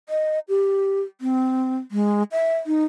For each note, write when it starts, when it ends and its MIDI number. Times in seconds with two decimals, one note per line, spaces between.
0.09 0.39 75
0.49 1.01 67
1.21 1.77 60
1.91 2.23 56
2.32 2.56 76
2.66 2.84 63